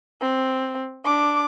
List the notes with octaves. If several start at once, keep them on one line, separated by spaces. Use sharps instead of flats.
C4
D4 D6